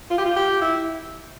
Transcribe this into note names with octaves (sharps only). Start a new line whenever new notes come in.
F4
G4
F4
G4
E4